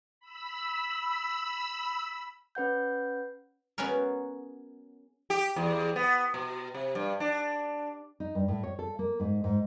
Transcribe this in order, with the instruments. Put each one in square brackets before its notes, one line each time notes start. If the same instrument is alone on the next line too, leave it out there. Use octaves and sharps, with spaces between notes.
[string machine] B5 E6
[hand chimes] C#4 B4 F#5 G6
[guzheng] B3 C#4 F#4 G#4 A#4
[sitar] G4
E2
B3
B2
C3
G2
D4
[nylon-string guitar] D#4
G2
A2
C#5
A4
A#3
G#2
G#2